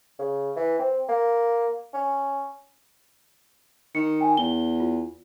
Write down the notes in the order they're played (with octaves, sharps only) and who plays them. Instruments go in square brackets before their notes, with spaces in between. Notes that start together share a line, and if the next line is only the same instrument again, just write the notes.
[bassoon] C#3
E3
C4
A#3
C#4
[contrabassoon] D#3 [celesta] C#7
[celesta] G5 G#5
[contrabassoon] E2 [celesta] G7
[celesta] F4